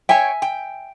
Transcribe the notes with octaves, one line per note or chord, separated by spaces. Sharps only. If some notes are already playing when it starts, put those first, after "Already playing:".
C#5 E5 G5 G#5
G5